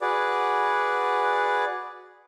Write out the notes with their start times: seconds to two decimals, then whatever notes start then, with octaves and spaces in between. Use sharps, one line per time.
0.01 F#4 G#4 B4 D5